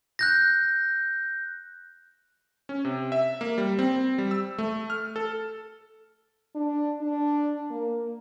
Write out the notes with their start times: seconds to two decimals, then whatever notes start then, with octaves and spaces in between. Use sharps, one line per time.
0.19 F#6 G6 A#6
2.69 C#4
2.85 C3
3.12 E5
3.41 A#3
3.58 G3
3.79 C4
4.18 G3
4.31 E6
4.58 A3
4.90 F6
5.16 A4
6.55 D4
7.02 D4
7.70 A#3